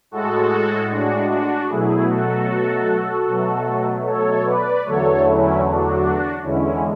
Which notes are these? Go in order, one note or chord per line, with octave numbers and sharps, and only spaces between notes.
A2 G#3 F#4 A4
D4 F#4
D4 F#4
B2 F#3 A3 E4 G#4
F#4 A4
B2 F#3 A3
A4 C#5
B4 D5
E2 D3 F#3 A3 A4 C#5
C#4 E4
D4 F#4
E2 D3 G#3 C#4 E4